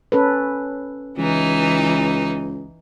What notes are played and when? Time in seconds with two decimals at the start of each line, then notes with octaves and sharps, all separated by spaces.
0.12 C#4 A4 B4
1.18 C#2 E3 D#4